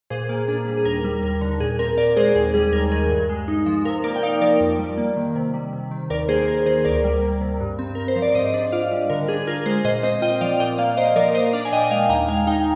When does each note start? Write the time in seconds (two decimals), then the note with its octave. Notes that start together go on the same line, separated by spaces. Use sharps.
0.10 A#2 G#4 C5
0.29 A#3
0.48 D4 G#4
0.67 G3
0.77 G#4
0.85 D#2 A#4
1.04 G3
1.23 D#2 A#4
1.41 D3
1.60 A#2 G#4
1.79 C4 A#4
1.98 A#2 A#4 D5
2.17 G#3 G#4 C5
2.35 D#2 G#4
2.54 G3 G#4
2.73 D#2 A#4
2.91 D#3 G#4
3.10 G2
3.29 G#3
3.48 D#4
3.66 F3
3.85 C3 A#4
4.04 A#3 A#4 D5
4.16 G5
4.23 D#4 D5 F5
4.41 F3 A#4 D5
4.60 F2
4.79 G3
4.98 A#3
5.17 D#3
5.35 C3
5.54 G3
5.73 C3
5.91 D#3
6.10 D#2 A#4 D5
6.28 A#3 G#4 C5
6.47 D#2 A#4
6.66 D#3 G#4 C5
6.85 D2 A#4 D5
7.04 G3
7.22 A#3
7.41 C3
7.60 G2
7.79 C4
7.95 G2 A#4
8.08 C5
8.16 F3
8.22 D5
8.35 G#2 C5 D#5
8.54 D4
8.72 F4 D5 F5
8.91 G3
9.10 D3 A#4
9.28 D4 G#4
9.42 G#4
9.47 F4 A#4
9.66 G#3 G#4 C5
9.85 A#2 C5 D#5
10.03 C4 C5 D#5
10.22 F4 D#5 G5
10.41 F3 D5 F5
10.60 A#2 D#5 G5
10.78 A#3 D5 F5
10.97 A#2 C5 D#5
11.16 F3 A#4 D5
11.35 A#2 C5 D#5
11.53 D4 D5 F5
11.65 G#5
11.72 A#2 D#5 G5
11.91 G#3 F5 G#5
12.09 D#2 G5 A#5
12.28 G#3 F5 G#5
12.47 D#4 G5 A#5